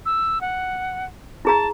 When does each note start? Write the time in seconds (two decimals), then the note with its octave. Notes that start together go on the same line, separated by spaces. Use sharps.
0.06 E6
0.41 F#5
1.45 E4 G#4 A5 A#5